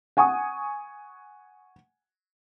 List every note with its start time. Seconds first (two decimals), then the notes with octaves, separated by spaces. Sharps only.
0.17 F#5 G#5 C#6 D#6